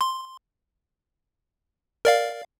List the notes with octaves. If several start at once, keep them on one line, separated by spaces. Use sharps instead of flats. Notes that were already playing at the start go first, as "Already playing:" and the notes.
C6
A#4 D5 F5